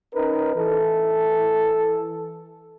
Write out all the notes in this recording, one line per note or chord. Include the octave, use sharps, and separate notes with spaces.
C#4 D#4 A#4 B4
E3 A4